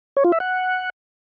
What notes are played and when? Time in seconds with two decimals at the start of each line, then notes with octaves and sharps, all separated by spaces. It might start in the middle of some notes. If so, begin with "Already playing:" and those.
0.17 C#5
0.24 F4
0.32 E5
0.40 F#5